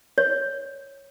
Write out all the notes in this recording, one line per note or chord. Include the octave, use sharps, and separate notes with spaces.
C#5